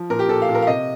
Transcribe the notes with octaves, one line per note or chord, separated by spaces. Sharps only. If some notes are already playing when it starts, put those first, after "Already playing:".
Already playing: F3
A#2 A#4
G4
A#2 A4
F5
A#2
A#4
F5
C3 D#5